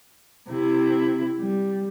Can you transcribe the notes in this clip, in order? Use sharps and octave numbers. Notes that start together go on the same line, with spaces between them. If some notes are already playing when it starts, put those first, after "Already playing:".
C3 E4
G3